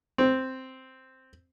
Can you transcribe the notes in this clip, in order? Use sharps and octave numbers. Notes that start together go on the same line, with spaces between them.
C4